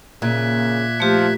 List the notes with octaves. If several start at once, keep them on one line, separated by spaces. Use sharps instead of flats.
A#2 C#3 E5 F#6 G#6
F3 A3 G4